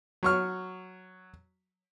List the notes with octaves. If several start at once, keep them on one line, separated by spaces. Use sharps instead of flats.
F#3 C#6 F6